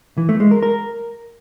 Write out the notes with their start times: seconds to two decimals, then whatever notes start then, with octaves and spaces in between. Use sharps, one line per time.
0.18 E3
0.29 A3
0.40 G#3
0.51 A#4
0.62 A#4